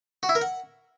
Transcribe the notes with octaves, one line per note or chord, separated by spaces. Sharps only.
F#4
E4
A#4
F#5